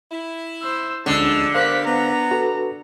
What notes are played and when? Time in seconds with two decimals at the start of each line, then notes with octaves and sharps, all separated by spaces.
0.11 E4
0.62 C5 E6
1.06 D2 D3 F3 G3 G#3 C#4 A5 E6
1.54 B3 G4 A#4 C5 F5 F#6 B6
1.85 B3 A#5
2.31 F#4 A4 B4